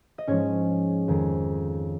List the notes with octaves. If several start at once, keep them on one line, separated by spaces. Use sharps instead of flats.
D#5
G#2 F3 G#3 C#4 C#5
F2 D#3 G#3